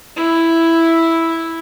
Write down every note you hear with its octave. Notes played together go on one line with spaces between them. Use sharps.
E4